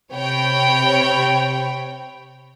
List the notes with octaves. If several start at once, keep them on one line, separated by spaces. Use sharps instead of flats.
C3 C#5 G5 B5